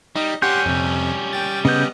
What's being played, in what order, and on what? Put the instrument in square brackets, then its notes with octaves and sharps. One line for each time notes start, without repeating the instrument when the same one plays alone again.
[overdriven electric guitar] G3 [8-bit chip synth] D#4 D#5
[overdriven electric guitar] G3 C#4 [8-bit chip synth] G4 F#5 C6 [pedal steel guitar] G6
[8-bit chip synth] F2 C3
G5 A6
[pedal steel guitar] C#3 G6 [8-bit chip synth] B3 D#5